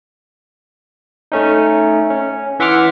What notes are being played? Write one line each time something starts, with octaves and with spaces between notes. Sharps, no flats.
A3 C#4 D#4
C#4
E3 E5 F#5 C6 D6 F6